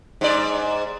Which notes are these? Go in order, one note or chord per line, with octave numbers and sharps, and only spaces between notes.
G#2 D5